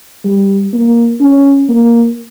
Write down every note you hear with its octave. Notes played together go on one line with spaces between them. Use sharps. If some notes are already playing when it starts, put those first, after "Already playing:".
G3
A#3
C#4
A#3